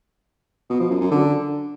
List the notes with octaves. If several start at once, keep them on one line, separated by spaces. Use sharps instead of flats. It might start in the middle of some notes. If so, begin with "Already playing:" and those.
B2
F3
F#2
F#2
D3